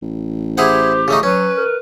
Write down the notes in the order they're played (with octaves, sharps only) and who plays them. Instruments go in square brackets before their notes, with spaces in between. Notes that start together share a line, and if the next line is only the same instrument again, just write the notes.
[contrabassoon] A1
[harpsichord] E4 G#4 F#5 [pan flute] G4 [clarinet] C5
[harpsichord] C#3 A3 D#4
[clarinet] F#3 [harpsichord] C#4 [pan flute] B4
[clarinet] A#4